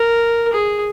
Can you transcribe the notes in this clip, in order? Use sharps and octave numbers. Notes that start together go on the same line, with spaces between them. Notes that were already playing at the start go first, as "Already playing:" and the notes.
Already playing: A#4
G#4